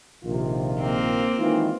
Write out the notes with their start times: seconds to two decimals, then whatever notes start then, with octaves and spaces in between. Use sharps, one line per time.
0.24 A#1 C3 D#3 F4
0.80 A#3 C4
1.38 D#3 E3 G#3 F4